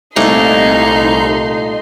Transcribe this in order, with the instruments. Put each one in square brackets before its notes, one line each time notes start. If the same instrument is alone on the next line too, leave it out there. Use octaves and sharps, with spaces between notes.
[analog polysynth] C2 [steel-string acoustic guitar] A#2 A3 [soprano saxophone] D#4 [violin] D#5 C6